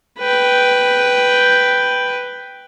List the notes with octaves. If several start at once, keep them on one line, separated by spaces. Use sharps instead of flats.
B4 G5